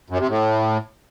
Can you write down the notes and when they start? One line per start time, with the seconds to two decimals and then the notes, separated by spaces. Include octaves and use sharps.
0.10 F#2
0.19 C3
0.29 A2